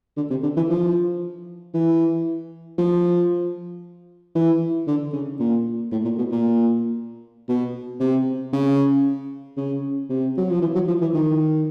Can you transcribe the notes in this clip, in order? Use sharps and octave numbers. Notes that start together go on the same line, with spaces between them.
D3
C3
D3
E3
F3
E3
F3
E3
D3
C#3
A#2
A2
A#2
B2
A#2
B2
C3
C#3
C#3
C3
F#3
F3
E3
F#3
F3
E3
D#3